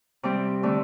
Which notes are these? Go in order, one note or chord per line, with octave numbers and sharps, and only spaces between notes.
C3 G3 C4 D6
D3 A3 C4 D6